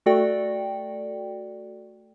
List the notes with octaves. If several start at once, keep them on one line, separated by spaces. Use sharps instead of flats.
A3 F#4 A4 D5 G5